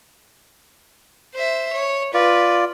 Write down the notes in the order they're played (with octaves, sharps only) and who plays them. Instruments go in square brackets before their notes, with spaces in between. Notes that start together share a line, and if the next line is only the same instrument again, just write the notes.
[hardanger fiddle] C5 E5
C#5
[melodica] F4 D5 [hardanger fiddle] B4